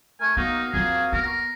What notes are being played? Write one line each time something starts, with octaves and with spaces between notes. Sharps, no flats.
A3 A#4 G#5
A#3 B3 D#4 F#4 F5
F2 F3 G#4
B3 A#4